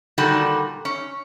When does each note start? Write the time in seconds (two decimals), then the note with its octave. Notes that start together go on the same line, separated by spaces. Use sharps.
0.18 A#2 D3 D#3 G3 F#4
0.85 C#4